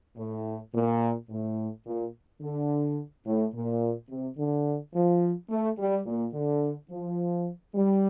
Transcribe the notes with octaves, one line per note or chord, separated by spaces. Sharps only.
A2
A#2
A2
A#2
D3
A2
A#2
C3
D3
F3
A3
G3
A#2
D3
F3
G3